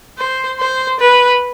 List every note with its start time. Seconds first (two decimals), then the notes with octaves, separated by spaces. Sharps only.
0.18 C5
0.59 C5
0.99 B4